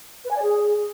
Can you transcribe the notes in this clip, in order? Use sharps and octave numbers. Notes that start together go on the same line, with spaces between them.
B4
G#5
D5
G#4